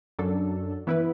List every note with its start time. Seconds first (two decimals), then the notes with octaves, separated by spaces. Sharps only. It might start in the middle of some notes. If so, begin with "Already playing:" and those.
0.19 F#2 F#3 D4 A4
0.87 E3 B3 E4 B4